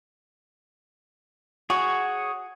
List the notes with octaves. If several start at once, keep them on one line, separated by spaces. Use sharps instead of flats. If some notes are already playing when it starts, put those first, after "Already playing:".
F#4 G#4 C#5